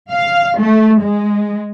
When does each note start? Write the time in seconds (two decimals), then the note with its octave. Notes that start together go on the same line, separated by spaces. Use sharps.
0.11 F5
0.59 A3
1.00 G#3